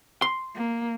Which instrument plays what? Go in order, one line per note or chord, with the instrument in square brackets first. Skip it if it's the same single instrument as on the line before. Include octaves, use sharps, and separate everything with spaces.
[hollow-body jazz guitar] C6
[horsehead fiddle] A#3